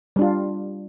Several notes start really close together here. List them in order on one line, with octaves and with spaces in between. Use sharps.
G3 D4 F4